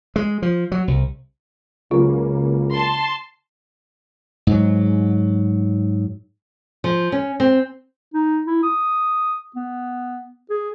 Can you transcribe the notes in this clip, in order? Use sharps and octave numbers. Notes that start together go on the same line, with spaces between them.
G#3
F3
F#3
C2
C#2 C#3 F#3 A#3 F4
A5 C6
G#2 F#3
F3
C#4
C4
D#4
E4
D#6
B3
G#4